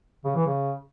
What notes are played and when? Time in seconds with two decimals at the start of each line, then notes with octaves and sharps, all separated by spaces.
0.25 C#3
0.35 E3
0.46 C#3